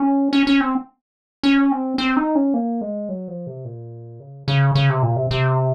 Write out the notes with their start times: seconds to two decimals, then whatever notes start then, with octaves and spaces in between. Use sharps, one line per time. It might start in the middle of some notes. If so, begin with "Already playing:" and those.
Already playing: C#4
0.33 C#4
0.47 C#4
0.61 C4
1.43 C#4
1.72 C4
1.98 C4
2.17 D#4
2.35 C#4
2.54 A#3
2.81 G#3
3.09 F#3
3.28 F3
3.47 C3
3.65 A#2
4.20 C#3
4.48 C#3
4.75 C#3
4.90 C3
5.03 A#2
5.16 C3
5.31 C3